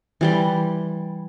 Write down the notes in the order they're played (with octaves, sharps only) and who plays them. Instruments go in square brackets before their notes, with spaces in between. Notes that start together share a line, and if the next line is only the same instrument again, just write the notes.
[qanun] E3 G3 C6